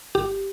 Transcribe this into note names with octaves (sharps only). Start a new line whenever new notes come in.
G1 G4